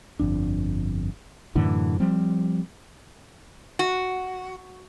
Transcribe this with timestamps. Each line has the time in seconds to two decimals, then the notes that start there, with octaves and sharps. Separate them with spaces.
0.19 G1 F2 D4
1.55 F#2 A2 D3 E3
2.00 F3 G3 C4
3.79 F#4